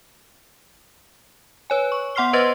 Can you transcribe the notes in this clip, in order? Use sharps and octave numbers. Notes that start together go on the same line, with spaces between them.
B4 C#5 G#5
C#6
B3 F#5 C6 F6 C7 G7
B4 C5 D#5 C6 A6 A#6